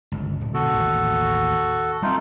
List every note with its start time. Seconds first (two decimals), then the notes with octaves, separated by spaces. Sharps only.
0.12 G1 C#2
0.41 D1
0.54 B2 D3 F#4 A4
0.74 A1 D#2
2.02 G3 A3 C4 D#4 F4